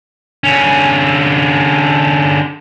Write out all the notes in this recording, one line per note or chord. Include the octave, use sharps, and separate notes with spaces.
D3 C#4